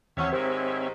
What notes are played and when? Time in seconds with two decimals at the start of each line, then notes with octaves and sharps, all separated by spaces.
0.17 D#2 C3 E3 C4 C#4 C#5 E5 F#5
0.33 G#2 D#3 G4 C5